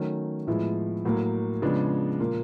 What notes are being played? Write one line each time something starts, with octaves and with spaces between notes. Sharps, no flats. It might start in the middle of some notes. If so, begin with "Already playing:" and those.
Already playing: D#3 F#3 A3 C#4
A2 F3 G#3 B3 E4
A2 F#3 A#3
C#3 F3 G#3 B3 D4
A#2 F3 A#3